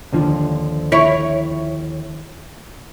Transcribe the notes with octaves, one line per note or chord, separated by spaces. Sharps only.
D#2 D3 F3
E4 C#5